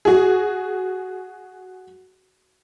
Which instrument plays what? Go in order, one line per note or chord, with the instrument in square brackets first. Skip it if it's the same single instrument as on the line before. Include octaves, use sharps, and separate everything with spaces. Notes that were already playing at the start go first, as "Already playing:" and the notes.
[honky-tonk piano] F#4 G#4